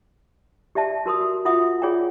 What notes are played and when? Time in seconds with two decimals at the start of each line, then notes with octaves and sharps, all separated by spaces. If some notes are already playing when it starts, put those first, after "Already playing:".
0.75 G4 D5 E5 A5
1.06 F#4 A#4 C6 D#6
1.21 F#4
1.45 F4 E5 F#5 D#6
1.82 F4 G#4 C#5 D5 F#5 G5